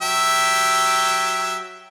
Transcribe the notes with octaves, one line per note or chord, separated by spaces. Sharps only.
F#3 G4 E5